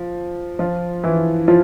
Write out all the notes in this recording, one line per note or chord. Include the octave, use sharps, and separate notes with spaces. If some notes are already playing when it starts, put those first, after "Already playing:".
Already playing: F3
F3 F4
E3 E4
F3 F4